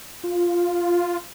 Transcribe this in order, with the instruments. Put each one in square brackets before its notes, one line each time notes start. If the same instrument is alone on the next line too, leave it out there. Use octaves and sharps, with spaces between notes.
[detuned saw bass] F4